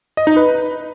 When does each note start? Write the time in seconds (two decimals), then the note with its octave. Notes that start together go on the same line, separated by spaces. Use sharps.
0.17 D#5
0.27 D#4
0.36 B4